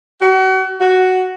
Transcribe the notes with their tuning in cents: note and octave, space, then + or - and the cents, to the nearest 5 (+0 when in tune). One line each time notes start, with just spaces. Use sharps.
F#4 +35
F#4 +5